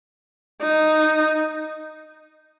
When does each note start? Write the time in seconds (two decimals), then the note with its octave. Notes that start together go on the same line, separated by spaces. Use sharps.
0.62 D#4